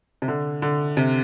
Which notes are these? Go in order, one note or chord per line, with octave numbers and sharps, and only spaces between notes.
C3
D3
D3
C3